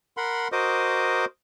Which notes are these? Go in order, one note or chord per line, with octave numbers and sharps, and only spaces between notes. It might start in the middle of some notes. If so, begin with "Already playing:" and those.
A#4 F#5 B5 C6
F#4 A#4 C5 D#5 D6 D#6